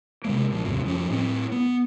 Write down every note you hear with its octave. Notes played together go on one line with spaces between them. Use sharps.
C3 G#3 A#3
A#1 F3
D#2 G#2 C3
F2 F3 C#4
A2 C4
B3